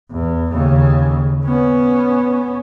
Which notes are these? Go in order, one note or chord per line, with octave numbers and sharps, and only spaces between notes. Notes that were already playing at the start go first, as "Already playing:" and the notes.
E2
D#2 C#3
B3 C#4